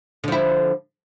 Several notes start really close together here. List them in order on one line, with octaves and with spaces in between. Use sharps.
D3 F3 E4